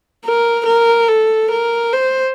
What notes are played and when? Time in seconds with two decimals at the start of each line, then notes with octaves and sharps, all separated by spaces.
0.25 A#4
0.66 A#4
1.09 A4
1.52 A#4
1.93 C5